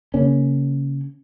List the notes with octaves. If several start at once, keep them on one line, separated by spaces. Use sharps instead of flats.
C#3 A#3 C#4